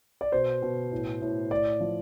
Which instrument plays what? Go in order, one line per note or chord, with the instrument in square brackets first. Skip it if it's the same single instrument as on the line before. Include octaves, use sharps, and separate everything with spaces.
[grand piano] D5
B2 C5
B2
A2
A2
A2 D5
F3